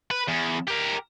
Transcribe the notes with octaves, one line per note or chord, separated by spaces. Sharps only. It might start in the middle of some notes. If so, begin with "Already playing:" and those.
B4
E2
G4 A#4